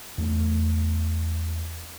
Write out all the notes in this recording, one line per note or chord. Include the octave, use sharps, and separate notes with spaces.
E2 A3